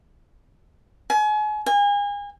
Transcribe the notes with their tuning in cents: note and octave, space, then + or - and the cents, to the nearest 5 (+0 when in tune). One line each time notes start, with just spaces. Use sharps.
G#5 +35
G#5 -35